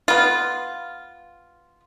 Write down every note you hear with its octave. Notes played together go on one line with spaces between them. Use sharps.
B3 F4